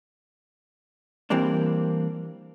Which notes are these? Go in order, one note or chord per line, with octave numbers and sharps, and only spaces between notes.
E3 G3 A#3 C4 D4